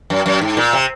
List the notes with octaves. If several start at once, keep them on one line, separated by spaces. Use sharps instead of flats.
F#2
F#2
G#2
A#2
C3